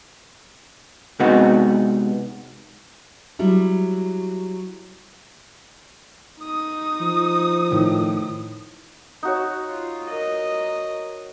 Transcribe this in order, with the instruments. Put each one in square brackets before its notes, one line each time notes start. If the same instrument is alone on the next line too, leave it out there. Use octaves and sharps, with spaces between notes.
[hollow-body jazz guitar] C3 G#3 B3 D#4 F#4
[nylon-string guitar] F#3 G3 E4
[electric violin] D#4 D#6
[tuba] F3
[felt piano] A2 D#3
[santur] D#4 F#4 C#5
[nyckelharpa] F4
A#4 D#5